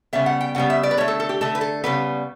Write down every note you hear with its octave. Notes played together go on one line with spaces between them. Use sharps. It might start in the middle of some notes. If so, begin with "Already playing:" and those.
C#3 G3 B3 E5
F#5
G5
C#3 G3 B3 F#5
E5
D5
B4
D3 A3 C#5
A4
A4
G4
D3 A3 A4
B4
A4
C#3 G3 B3 B4